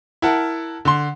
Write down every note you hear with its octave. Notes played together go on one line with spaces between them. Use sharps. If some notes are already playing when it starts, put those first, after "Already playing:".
E4 A#4 F#5 A5
D3 C6